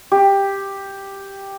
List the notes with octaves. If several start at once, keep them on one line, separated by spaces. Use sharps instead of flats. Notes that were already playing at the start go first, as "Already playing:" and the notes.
G4